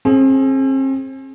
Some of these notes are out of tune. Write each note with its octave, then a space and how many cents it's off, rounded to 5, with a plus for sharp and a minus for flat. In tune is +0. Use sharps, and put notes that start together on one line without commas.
C4 +40 G#4 +20